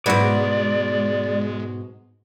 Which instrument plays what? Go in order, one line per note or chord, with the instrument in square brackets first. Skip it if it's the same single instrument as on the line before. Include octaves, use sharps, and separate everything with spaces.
[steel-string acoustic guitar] G#2 B2 [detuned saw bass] G#3 [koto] B3 E4 F#4 [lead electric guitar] D5